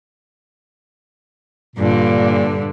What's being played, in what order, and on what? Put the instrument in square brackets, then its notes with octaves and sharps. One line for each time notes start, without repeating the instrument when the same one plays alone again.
[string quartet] G2 D3 [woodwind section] A#2 A#3